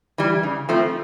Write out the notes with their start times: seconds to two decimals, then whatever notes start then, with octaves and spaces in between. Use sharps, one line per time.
0.18 E3 G3
0.43 C#3
0.69 F3 A3 C4